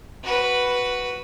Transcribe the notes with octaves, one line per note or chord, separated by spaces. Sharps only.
F#4 B4